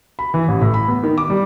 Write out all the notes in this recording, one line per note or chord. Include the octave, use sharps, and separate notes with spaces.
B5
E3
A1
A2
B5
B3
D#3
D6
G3